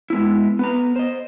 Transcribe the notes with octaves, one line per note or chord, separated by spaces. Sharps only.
G#3 B3 E4
B3 B4 A#5
C5 D#5